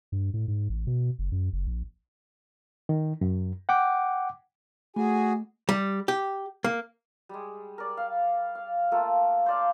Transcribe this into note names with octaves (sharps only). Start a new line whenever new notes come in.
G2
A2
G#2
A1
B2
F#1
F#2
F#1
A#1
D#3
F#2
F#5 G5 D6
A3 F#4 G#4 G#5
G3
G4
A#3
G3 G#3
A#4 D5
F5
F5
A3 A#3 F4 A4
C5 D5 F5